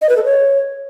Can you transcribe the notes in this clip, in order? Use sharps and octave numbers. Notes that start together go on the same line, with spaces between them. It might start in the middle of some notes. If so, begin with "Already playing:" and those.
D#5
B4
A4
C#5